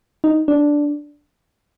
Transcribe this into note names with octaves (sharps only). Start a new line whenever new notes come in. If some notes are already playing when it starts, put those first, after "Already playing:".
D#4
D4